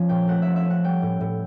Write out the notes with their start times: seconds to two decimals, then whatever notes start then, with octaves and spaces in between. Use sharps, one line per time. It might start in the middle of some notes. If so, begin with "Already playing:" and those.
Already playing: F3 C#4
0.09 A#2 G5
0.28 A3 F#5
0.42 F3 E5
0.56 E5
0.65 C#4
0.70 F#5
0.84 G3 G5
1.02 A2
1.21 A2